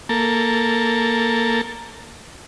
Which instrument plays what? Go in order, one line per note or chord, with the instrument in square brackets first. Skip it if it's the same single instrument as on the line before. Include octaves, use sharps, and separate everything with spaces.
[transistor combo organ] A#3 A4